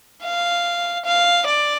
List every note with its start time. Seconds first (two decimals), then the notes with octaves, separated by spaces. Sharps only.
0.24 F5
1.06 F5
1.47 D5